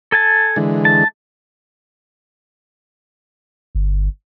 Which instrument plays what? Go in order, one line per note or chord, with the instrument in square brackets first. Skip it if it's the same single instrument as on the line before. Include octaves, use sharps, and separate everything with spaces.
[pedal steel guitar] A4 G#5 A5
[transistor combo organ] D3 E3 G#3
[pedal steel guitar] A5
[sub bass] G1